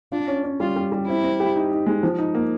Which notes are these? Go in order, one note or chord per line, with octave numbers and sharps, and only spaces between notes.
D4 F4
C#4
C#4
G3 F4
G3
G3
C4 E4
C4
G4
D#4
D#4
G#3
F3
D#4
A#3